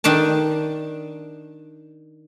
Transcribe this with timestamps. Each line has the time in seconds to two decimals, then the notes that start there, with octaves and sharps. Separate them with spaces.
0.04 D#3 D4 D5 A5